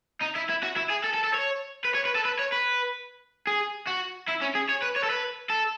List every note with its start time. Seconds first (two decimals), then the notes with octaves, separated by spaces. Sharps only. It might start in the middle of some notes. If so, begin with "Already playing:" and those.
0.22 D#4
0.36 E4
0.50 E4
0.63 F#4
0.77 E4
0.90 G#4
1.04 A4
1.14 A4
1.24 A4
1.34 C#5
1.85 B4
1.95 C#5
2.05 B4
2.15 A4
2.25 B4
2.39 C#5
2.52 B4
3.47 G#4
3.87 F#4
4.28 E4
4.41 C#4
4.55 G#4
4.69 C#5
4.82 B4
4.96 C#5
5.03 A4
5.10 B4
5.50 A4